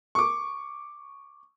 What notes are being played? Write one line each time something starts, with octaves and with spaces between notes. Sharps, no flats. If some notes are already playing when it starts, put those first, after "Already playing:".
C#6 D6